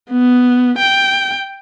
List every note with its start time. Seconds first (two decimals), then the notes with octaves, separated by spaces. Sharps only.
0.11 B3
0.78 G5